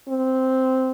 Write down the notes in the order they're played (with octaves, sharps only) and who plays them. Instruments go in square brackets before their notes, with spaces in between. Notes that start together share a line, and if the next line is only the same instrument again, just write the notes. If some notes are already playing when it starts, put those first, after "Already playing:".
[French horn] C4